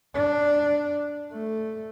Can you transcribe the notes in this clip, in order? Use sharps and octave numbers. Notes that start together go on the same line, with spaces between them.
D4
A3